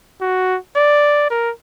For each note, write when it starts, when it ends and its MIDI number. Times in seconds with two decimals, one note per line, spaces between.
0.21 0.57 66
0.76 1.29 74
1.30 1.51 70